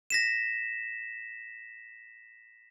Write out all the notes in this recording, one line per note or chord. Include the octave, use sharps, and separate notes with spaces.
A#6 B6 E7